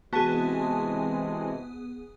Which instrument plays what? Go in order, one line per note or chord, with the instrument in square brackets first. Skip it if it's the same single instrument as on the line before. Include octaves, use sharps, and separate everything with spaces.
[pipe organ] C3 E3 G#3 [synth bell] B3 G#4 [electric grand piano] F#4 A5